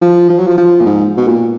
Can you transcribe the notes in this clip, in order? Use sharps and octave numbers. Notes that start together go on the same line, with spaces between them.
F3
F3
F#3
F3
F3
A#2
G#2
B2
A#2